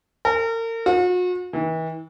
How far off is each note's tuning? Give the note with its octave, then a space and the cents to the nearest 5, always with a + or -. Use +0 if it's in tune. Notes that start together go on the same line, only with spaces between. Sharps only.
A#4 -35
F#4 -40
E3 -40